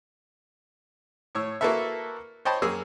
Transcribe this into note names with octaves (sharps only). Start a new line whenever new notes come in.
A2 C#5 E6
A#3 E4 F#4 A4 B4 E5
C5 C#5 D#5 G5 A5 B5
F#2 A#3 G#4 E6